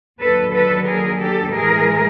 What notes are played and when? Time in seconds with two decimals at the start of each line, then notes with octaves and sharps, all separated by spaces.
0.20 D#2 D3 F#3 A4 B4
0.53 A4 B4
0.87 G#4 A#4
1.20 G4 A4
1.53 A2 E3 G#3 G#4 A#4